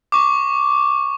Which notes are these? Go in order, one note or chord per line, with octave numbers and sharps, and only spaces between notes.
C#6 D6